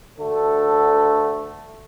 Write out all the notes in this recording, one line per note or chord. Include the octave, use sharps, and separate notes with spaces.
D2 D3 A3 A4